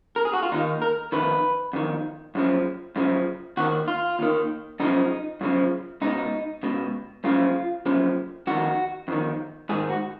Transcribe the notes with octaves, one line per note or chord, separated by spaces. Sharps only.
A#4
G#4
F#4
F4
D#2 D#3 D#4
A#4
F2 D#3 B4
F2 D#3
F#2 C#3 F3
F#2 C#3 F3
D#2 D#3 F#4
F4
D#2 D#3
F#2 C#3 F3 D#4
F#2 C#3 F3
C#2 B2 D#4
C#2 B2
F#2 C#3 F3 F4
F#2 C#3 F3
F2 D#3 F#4
F2 D#3
G#2 D#3 G#4
F#4